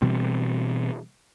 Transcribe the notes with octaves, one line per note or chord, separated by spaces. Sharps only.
B2 E3 G3 C4